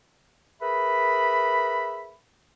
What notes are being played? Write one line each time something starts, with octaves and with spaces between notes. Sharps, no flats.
G#4 A#4 B4 E5 B5